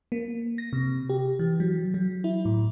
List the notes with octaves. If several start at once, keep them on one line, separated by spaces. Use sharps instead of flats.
A#3
A#6
C3
G4
E3
F#3
F#3
E4
A2